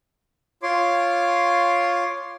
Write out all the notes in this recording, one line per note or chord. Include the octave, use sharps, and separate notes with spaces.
F4 C#5 C6 D6